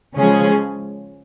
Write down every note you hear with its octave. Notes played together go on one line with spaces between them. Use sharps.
C#3 F3 G#3 C#4 G#4